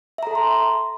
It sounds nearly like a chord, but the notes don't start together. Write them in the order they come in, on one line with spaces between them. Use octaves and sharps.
E5 A#5 A4 A5 C6